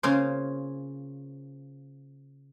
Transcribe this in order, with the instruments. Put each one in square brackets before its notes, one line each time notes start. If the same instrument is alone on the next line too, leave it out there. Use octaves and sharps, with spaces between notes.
[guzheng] C#3 A#3 F4 G#4 C5